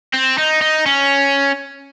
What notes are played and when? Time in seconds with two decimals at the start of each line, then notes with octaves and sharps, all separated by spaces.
0.14 C4
0.38 D#4
0.62 D#4
0.86 C#4